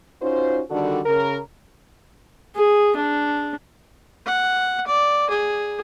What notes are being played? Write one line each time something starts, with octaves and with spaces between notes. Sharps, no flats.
C#4 D#4 F4 F#4 C5
D3 D#3 G3 D4 F#4 A4
C#3 A#4
G#4
D4
F#5
D5
G#4